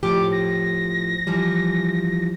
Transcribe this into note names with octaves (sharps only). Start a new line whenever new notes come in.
A2 F3 G4 D6
A#6
E3 F3 G3